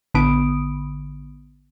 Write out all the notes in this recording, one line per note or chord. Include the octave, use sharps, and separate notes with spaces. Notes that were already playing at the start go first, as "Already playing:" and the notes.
A1 D3 B3 B5 D#6 D7